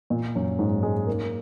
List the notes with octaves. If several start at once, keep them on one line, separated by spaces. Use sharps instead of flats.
A#2
F#2
G#2
G#3
A#3